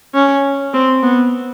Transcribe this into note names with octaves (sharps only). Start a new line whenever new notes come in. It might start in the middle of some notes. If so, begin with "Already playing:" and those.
C#4
C4
B3